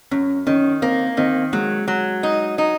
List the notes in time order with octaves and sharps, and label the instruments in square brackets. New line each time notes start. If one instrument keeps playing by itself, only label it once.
[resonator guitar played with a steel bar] F#2 [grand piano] C#4
[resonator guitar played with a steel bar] D#3 [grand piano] C#4
[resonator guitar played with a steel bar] A#3 [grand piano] C4
[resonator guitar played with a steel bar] D#3 [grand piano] C4
[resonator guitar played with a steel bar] F#3 [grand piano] G#3
[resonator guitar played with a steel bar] F#3
D#4
D#4